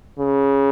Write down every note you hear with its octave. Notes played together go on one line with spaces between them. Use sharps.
C#3